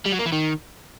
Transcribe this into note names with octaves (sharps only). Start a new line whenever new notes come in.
G3
F#3
A#3
E3
D#3